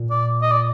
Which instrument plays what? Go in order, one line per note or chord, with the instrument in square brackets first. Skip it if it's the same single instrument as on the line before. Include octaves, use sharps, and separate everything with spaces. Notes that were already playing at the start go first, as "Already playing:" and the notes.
Already playing: [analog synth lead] A#2
[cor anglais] D5
D#5
D5